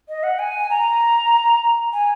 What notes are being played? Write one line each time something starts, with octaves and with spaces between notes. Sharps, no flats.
D#5
F#5
G#5
A#5
G#5